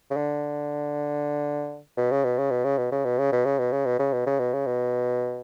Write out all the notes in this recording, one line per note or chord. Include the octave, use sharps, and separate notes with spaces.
C#3
D3
B2
C#3
B2
C#3
B2
C#3
B2
C#3
B2
C#3
B2
C#3
B2
C#3
B2
C#3
B2
C#3
B2
C#3
B2